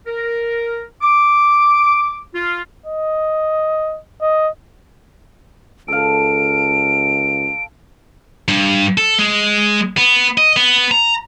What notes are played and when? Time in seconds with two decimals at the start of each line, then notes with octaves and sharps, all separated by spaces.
0.07 A#4
1.02 D6
2.35 F4
2.86 D#5
4.21 D#5
5.88 C#2 A4 F5 D7
8.48 G2
8.97 A4
9.19 G#3
9.97 B3
10.38 D#5
10.57 B3
10.91 A#5